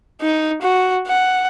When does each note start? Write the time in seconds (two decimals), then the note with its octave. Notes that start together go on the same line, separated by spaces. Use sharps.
0.22 D#4
0.62 F#4
1.07 F#5